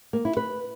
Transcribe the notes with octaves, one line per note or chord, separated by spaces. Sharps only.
A#3
E4
B4